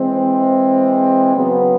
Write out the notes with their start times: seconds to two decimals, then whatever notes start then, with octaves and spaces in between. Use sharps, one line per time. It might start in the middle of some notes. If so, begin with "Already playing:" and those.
Already playing: E3 G#3 C4
1.36 C#3 F#3 B3